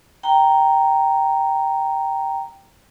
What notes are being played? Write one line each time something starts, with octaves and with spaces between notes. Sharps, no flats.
G5 A#5